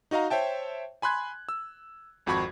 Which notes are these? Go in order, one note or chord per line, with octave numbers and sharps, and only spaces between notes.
D#4 F#4 D#5 F5 A#5
C5 C#5 E5 G5 A5
G#5 B5 C6 F#6 G#6
E6
G#1 F2 F#4 B5 C#6 G#6